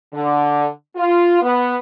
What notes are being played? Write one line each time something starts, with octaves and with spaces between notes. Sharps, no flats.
D3
F4
B3